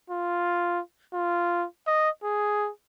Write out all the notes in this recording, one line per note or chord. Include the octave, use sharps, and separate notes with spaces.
F4
F4
D#5
G#4